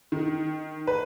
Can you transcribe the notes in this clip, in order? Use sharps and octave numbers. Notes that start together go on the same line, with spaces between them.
D#3
B4